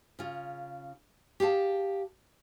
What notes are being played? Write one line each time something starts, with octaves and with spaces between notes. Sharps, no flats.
C#3 F4
G4 G#4 F5 A5